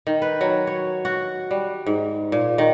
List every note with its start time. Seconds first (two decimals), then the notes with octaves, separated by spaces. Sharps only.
0.07 D#3
0.22 B4
0.41 F#3
0.67 C#5
1.05 F#4
1.51 G3
1.86 G#2
2.32 A#2
2.58 D#3